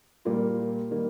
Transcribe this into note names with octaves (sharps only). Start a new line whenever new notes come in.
A#2 G3 A#3 F4
D#3 G3 A#3